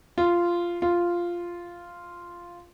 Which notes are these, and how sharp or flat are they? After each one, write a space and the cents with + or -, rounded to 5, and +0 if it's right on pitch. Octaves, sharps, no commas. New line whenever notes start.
F4 -10
F4 -5